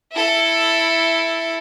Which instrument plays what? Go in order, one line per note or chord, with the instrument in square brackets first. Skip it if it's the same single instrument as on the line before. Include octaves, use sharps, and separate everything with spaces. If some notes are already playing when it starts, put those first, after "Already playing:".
[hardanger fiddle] E4 A4